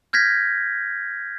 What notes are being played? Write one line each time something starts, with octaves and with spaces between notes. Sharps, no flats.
F6 G6 G#6 A#6 B6